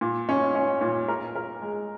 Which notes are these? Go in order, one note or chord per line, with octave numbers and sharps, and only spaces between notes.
A#2
C#4
C#4
A#2
A#4
A#4
G#3